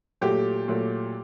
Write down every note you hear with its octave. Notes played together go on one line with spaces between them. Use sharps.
A#2 F#3 A3 G4
A#2 F#3 A3